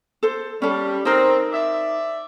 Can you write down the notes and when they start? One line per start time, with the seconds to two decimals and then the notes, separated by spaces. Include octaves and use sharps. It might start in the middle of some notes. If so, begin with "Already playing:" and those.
0.23 A4 C5
0.62 G3 C#4 A4
1.05 C4 D#4 A#4
1.53 D5 E5